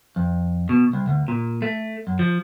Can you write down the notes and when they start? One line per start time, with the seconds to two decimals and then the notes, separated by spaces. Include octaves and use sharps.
0.16 F2
0.69 B2
0.93 C2
1.08 D2
1.28 A#2
1.62 A3
2.07 F#2
2.19 F3